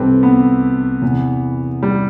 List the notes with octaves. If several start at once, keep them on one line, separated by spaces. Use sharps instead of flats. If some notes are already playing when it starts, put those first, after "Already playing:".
Already playing: C2 C3 E3 C4 G4 A4 B4
B3
E2 C3 E3
G3